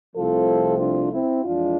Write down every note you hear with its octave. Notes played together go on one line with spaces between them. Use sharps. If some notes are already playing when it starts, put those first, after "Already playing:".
C2 C3 F3 A3 C4 F4 A4
D4 F4
C4 E4
F2 E3 G#3 D4 F4